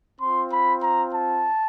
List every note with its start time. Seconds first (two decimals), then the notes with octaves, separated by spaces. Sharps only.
0.21 C4 F4 C6
0.52 B5
0.83 A#5
1.14 A5